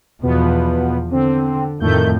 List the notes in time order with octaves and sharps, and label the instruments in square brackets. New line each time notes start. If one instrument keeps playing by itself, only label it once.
[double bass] E2 F3 [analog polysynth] B2 B3
[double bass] D3 [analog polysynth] C4
[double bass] F2 A2 [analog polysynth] D#3 A3 G6